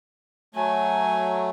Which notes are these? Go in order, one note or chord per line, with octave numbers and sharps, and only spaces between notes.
F#3 A3 G#5